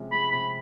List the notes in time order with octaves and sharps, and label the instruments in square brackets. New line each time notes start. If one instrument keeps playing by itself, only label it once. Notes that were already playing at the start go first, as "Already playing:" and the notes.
Already playing: [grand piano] C3 F3 G#3 C#4
[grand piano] G#3 [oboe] B5
[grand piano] C3 [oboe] B5